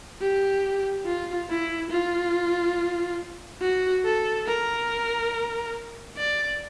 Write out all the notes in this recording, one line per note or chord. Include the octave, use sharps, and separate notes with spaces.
G4
F4
E4
F4
F#4
A4
A#4
D5